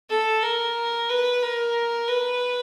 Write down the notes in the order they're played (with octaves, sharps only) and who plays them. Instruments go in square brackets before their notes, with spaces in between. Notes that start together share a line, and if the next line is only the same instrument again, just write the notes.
[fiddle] A4
A#4
B4
A#4
B4